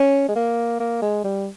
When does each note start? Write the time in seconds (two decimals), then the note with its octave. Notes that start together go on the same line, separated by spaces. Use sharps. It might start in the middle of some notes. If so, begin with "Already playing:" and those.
Already playing: C#4
0.28 G#3
0.36 A#3
0.80 A#3
1.02 G#3
1.24 G3